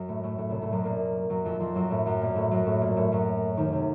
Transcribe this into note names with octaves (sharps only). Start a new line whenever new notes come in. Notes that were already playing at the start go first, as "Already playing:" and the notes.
Already playing: F#2 F#3
A2 A3
A2 A3
A2 A3
C2 C3
A2 A3
F#2 F#3
A#2 A#3
F#2 F#3
F2 F3
F2 F3
F#2 F#3
A2 A3
F#2 F#3
A#2 A#3
A2 A3
F#2 F#3
A2 A3
A#2 A#3
A2 A3
F#2 F#3
D#2 D#3
C3